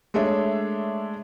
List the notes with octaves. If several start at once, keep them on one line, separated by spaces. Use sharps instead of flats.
G#3 A3 D4 C#5 E5